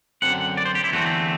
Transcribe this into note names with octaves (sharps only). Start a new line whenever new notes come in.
F#2 D3 F#3 C4 F#5
D5
C5
G4
E4
E2 D3 A3 C4 F#4